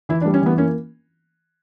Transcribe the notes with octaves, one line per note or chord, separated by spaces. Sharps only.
E3 E4
D4
G3
C#4
E3 B3
A#3 C#4